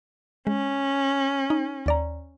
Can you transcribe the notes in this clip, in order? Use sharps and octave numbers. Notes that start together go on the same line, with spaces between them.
G#3 C#4
D#4
D#2 D5 A#5